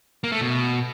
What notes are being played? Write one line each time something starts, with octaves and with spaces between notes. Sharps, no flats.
A#3
A3
B2